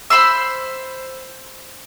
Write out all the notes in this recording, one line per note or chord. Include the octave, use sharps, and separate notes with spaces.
C5 B5 C6 E6